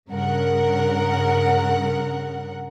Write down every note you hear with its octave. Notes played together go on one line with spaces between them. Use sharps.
G2 C#3 A#4 F#5